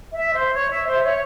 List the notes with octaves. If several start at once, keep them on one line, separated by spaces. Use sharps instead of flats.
E5
C5
C#5
E5
C5
E5
C#5